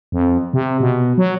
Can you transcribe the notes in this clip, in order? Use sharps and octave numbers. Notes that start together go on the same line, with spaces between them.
F2
C3
B2
F#3